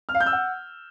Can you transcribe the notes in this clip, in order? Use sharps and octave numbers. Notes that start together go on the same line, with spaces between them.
F6
F5
G6
E6
F#5